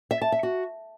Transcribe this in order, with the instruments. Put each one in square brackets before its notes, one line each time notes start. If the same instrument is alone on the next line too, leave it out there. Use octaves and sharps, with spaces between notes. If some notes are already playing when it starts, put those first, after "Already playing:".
[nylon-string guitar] E5
A5
E5
F#4